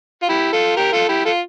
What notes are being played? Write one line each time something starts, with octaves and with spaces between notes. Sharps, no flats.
F4
E4 G4
F4 A4
G4 A#4
F4 A4
E4 G4
F4 A4